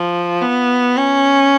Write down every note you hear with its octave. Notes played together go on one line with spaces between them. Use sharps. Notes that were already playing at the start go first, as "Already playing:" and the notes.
Already playing: F3
B3
C#4